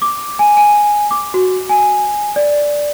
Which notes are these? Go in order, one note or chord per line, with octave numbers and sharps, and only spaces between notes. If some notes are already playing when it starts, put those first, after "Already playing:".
D6
G#5
G#5
D6
F#4
G#5
D5